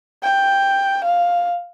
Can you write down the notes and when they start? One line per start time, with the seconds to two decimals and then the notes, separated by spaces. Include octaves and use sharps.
0.23 G5
1.05 F5